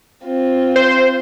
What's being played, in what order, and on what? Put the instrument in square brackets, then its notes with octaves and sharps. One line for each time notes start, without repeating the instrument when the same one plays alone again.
[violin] C4 F4
[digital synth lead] C5